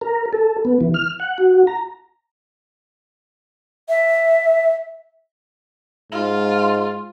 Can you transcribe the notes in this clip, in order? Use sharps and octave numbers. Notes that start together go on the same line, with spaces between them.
A#4
A4
B3
E3
F6
F#5
F#4
A#5
E5
G#2 F4